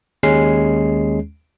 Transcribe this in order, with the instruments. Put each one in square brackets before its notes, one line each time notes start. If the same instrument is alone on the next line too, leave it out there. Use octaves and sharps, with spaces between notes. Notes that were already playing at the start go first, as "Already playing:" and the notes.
[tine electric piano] D#2 G#3 C#4 C7